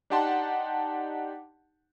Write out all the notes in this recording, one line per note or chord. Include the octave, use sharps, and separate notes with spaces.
D4 D#4 G4 F#5 A5 C6